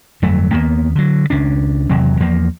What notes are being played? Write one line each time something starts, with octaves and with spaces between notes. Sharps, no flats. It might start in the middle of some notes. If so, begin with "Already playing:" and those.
G1 F2 F#3 A3
D#2 A2 A#3 B3
D3 F#3
C#2 C#4 D4
G#1 E2 C3 F#3
E2 F3 A#3